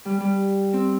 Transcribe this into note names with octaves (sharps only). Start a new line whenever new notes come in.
G3
G3
C4